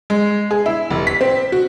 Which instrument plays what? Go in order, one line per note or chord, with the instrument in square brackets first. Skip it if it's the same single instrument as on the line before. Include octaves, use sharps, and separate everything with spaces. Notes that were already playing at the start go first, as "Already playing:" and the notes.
[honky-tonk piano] G#3
G#4
E4
F1
B6
C4
F#4